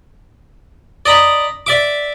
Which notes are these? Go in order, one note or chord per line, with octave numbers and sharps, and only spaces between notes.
D5 D#5 A#5 B5
D5 E5 D6